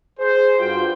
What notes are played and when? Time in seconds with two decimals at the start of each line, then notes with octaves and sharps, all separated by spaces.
0.19 G#4 C5
0.59 G2 G3 F4 F#4 G5